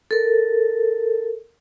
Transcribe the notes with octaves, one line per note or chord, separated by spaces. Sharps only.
A4 A#4